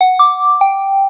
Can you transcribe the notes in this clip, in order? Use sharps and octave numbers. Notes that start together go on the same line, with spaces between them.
F#5
D6
G5